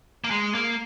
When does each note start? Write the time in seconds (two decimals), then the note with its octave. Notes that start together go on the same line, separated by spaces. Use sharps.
0.24 A#3
0.31 G#3
0.55 A#3